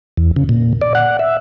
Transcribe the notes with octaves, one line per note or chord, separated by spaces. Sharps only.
E2
C#3
A#2
D5
F#5
E5